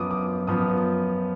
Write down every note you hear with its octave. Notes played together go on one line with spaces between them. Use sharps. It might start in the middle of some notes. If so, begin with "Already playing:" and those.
Already playing: F#2 F3 B3 D6 D#6
D6
F#2 F3 B3 D#6